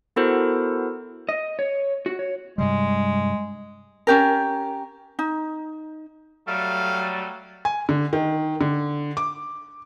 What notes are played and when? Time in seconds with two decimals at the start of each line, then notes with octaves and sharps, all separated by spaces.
0.16 B3 E4 F#4 A4 A#4 C5
1.29 D#5
1.59 C#5
2.06 F#4
2.19 C#5
2.58 G2 C3 G3 G#3
4.07 C#4 G4 A#4
5.19 D#4
6.48 F#3 G3 A3 F5
7.65 G#5
7.89 D3
8.13 D#3
8.61 D3
9.17 D6